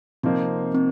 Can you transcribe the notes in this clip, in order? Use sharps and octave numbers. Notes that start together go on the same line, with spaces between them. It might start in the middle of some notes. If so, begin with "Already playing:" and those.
C3 F3 A#3 C4 D#4 C5
C4